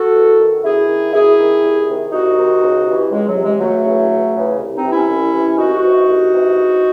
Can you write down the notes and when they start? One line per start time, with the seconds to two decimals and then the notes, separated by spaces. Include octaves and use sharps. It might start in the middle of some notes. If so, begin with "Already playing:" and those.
Already playing: F#4 A4
0.15 E2
0.39 D#3
0.64 F#2 E4 G#4
0.89 D#3
1.13 F#2 E4 G#4
1.38 D#3
1.63 C2
1.87 C3 D#3
2.12 C2 D#4 F#4
2.37 C3 D#3
2.62 C#2
2.86 C3 E3
3.11 C#2 G#3
3.27 F#3
3.35 C3 E3
3.44 G#3
3.60 C#2 F#3 A3
3.85 C#3 E3
4.10 C#2
4.35 C#3 E3
4.59 C2
4.76 C4 D#4
4.83 C3 E3
4.92 C#4 E4
5.08 C2
5.33 C3 E3
5.58 C2 D#4 F#4
5.83 C3 E3
6.07 C2
6.32 C3 E3
6.57 E2